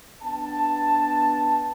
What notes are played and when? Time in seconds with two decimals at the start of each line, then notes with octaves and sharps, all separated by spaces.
0.23 B3 D4 G5 A5